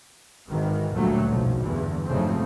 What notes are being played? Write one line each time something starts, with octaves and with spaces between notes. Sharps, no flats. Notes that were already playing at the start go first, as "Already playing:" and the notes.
G#1 D#3 E3
D2 G2 A#2 F#3 G3 A3
F#1 B1 F3
E2 G2 D3 E3
F#1 G#2 C#3 F3 A3 C4